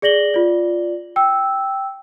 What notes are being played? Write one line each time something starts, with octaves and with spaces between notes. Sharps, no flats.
G#4 D5 A#6 F#7 G7
F4 D5
G5 E6